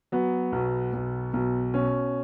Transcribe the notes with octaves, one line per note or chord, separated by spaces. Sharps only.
F#3 B3
B1
B1
B1
B2 C#4